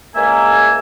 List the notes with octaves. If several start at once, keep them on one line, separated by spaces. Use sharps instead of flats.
C#2 G#3 A#3 A#4 E5 G#5